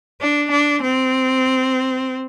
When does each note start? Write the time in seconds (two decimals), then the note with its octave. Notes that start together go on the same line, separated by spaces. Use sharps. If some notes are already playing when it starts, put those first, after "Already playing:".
0.21 D4
0.51 D4
0.82 C4